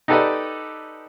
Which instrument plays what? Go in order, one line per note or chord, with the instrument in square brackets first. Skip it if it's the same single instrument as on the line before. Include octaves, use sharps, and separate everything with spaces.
[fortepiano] D#4 G4 A4 B4 D5 D#5